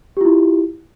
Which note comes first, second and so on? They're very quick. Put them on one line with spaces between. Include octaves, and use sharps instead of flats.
G4 F4 E4